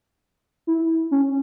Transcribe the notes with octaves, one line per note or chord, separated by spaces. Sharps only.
E4
C#4